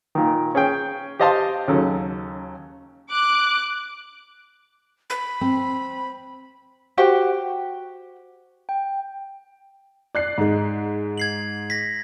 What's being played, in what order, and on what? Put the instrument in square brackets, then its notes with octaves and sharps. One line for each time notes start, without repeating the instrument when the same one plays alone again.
[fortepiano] A#2 D#3
C#4 G#4 G5
G4 C5 D#5 F5 A5 C6
D#2 C#3 F#3 A4
[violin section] D6 F#6
[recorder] B5
[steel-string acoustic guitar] C4
[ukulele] F#4 G4 C5 G5
[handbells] G5
[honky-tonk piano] D5 F#6 C7
G#2 G#3
[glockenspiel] G#6 C7 F#7
A#6 B6